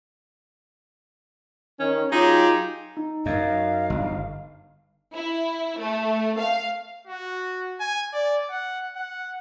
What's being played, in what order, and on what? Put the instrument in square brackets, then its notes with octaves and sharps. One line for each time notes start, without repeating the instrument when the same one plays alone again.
[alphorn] D#3 [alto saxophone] C#4
[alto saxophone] F#3 [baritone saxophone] D#4 [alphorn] F4 [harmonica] G4 G#4
[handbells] D#4
[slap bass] F#2 [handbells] D#4 D#5 [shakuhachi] F5
[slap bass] G1
[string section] E4
A3
F5
[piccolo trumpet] F#4
G#5
D5
F#5
F#5